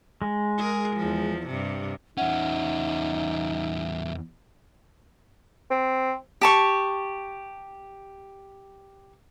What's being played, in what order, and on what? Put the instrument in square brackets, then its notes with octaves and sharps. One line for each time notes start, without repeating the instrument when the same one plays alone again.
[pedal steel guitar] G#3
[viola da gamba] G#4 A#4
E2 F3
G2 C3
[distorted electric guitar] E2 C#4 [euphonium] D#4 [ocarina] E5 [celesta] F#5
[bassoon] C4
[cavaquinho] G4 A5 C#6